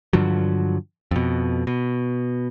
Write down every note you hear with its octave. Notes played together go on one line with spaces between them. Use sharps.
G2 D3 F3 F#3
F2 B2
B2